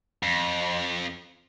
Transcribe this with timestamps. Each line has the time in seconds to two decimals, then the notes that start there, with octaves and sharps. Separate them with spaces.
0.23 F2